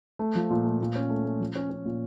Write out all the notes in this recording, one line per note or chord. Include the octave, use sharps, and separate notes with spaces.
A3
F3
A#2
A3
A#2
C#4
A3
A3
F3
C#4
C#4
A#2